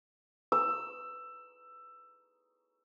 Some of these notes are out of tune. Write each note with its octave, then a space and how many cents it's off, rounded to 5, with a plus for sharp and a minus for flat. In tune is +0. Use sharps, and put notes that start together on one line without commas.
E6 +15